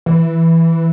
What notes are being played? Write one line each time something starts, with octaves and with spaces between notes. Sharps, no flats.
E3